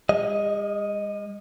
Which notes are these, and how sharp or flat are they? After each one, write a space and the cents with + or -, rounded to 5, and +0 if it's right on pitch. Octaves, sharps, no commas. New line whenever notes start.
G#3 -45 D#5 +0